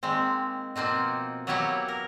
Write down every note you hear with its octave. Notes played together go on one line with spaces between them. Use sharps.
D#3 G#3 A#3 C4
B2 F3 A#3 C4 D#4
F#3 A#3 B3 E4 G4 C#5
A#4